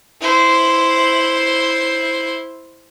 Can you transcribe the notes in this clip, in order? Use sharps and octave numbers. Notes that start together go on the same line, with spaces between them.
E4 C5